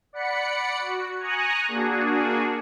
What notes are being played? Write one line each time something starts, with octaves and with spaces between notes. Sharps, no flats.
D5 F#5 B5 C#7
F#4
G#5 A#5 C#6 D#6 F#6
A#3 D4 F#4 G#4